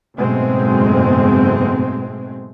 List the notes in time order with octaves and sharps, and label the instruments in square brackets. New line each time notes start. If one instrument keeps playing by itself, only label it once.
[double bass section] F#1 G#2 B2 G#3 A3 C4